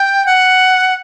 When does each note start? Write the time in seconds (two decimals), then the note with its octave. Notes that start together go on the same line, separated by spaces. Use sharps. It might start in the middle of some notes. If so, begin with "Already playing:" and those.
Already playing: G5
0.26 F#5